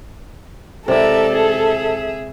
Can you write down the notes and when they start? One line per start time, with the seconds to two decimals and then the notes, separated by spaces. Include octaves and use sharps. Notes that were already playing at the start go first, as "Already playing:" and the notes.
0.88 C3 G#3 E4 A4 A#4 D5 E5
1.30 G#4 E5